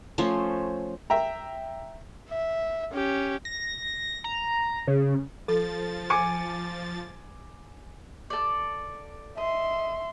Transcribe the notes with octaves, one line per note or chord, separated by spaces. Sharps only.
F3 A3 C#4 C5
E5 G5 A#5
E5
C#4 G4
A#6
A#5
C#3
F3 A4 A6
G#5 D6 C#7
A4 D5
D#5 E5 C6